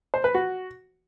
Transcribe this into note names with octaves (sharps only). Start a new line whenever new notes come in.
C5
B4
F#4